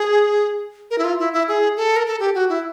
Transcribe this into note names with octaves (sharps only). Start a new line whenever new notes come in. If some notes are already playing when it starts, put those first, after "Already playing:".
Already playing: G#4
A#4
E4
F4
E4
E4
G#4
A4
A#4
A4
G4
F#4
E4